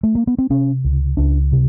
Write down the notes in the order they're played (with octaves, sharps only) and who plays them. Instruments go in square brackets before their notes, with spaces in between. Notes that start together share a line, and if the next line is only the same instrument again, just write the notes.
[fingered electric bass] A3
A#3
B3
C4
C3 C#4
C#2
C#2 D4
C3